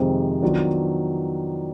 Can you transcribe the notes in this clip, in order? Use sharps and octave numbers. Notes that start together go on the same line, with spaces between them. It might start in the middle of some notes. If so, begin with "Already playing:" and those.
Already playing: F2 C3 D#3 G#3 C4
D#3 F#3 B3 D4 F4